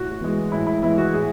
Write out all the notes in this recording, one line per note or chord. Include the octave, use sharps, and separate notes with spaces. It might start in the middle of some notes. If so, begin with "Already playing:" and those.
Already playing: A2 F#4
F#4
E3 G#3
A2 E4
E4
E3 G#3 E4
F#4
A2 G#4